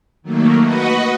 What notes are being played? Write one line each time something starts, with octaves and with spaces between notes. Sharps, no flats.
D#3 F#3 A3 A#3
F#4 B4 D#5 F#5